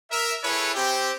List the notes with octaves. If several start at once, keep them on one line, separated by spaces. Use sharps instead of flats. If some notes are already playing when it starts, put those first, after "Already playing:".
A#4 E5
E4 G#4 A4 B4 C#5
C4 G4